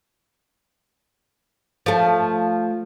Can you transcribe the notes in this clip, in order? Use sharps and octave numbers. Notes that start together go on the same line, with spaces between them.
F3 A3